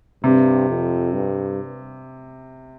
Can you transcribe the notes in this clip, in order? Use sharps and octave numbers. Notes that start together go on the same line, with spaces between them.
G2 C3
F2
G2